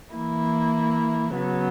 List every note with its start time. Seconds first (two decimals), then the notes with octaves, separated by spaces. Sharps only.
0.14 E3 A#3 E4
1.33 C#3 F#3 B3